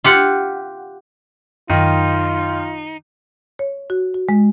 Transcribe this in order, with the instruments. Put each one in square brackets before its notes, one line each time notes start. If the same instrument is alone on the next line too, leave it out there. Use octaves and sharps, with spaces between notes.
[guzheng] F4 G4 F#5
[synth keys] F#2 [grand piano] D#3 [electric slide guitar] D#4 [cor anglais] F4
[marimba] C#5
F#4
F#4
G#3